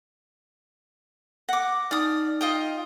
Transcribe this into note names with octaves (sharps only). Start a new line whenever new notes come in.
F#5 D6 A#6
D#4 D5 D#6 F6
F4 D#5 G5